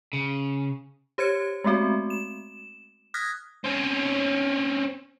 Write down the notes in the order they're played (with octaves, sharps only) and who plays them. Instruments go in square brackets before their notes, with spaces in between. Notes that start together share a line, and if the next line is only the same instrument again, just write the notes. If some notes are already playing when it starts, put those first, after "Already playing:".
[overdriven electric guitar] C#3
[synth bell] G4 C5 C#5 G#6 C#7
G#3 A3 B3 C4 F#4
E7
D#6 F6 F#6 G#6 A#6 B6
[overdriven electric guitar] C4 C#4